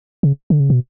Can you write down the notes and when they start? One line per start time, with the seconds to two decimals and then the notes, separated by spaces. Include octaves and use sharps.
0.23 C#3
0.50 D3
0.60 C#3
0.70 B2